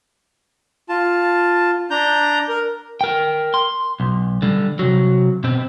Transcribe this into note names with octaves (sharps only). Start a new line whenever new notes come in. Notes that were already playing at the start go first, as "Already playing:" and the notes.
F4 A5
D4 A#5 G6
A#4
A#4 G5
C6
B1
D3 G3
C3 F#3
B2 C4